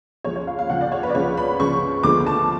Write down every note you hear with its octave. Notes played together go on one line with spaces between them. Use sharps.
C#2 C#3 F3 C#5
C#5
F5
F5
C#2 C#3 F3 F#5
D5
C#5
B4
D5
C#2 C#3 F3 C#5
B5
C#2 C#3 F3 C#6
D2 D3 F3 G#3 B3 D6
A5